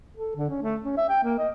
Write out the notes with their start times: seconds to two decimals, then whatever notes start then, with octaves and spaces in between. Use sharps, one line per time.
0.17 A4
0.36 D3
0.50 C#4
0.62 A3
0.84 C#4
0.97 E5
1.09 G5
1.24 A#3
1.38 D#5